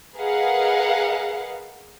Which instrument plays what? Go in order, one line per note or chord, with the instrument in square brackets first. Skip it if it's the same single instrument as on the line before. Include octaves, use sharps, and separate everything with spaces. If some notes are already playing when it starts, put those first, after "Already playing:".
[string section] G#4 A#4 B4 D#5 F5 F#5